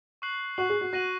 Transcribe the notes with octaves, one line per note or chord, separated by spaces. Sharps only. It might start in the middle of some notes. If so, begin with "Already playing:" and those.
C#6 F#6 C7 F#7
F#4 C#6 F#6 C7 F#7
G#4
F#4
F#4 F#6 A#6 D#7 F#7